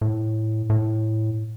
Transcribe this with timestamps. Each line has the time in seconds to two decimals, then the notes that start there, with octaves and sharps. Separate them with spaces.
0.01 A2
0.70 A2